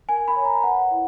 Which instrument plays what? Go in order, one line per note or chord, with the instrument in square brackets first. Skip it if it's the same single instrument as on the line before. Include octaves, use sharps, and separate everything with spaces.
[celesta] A#4 G#5
B5
C#5
A#5
B4 F#5
E4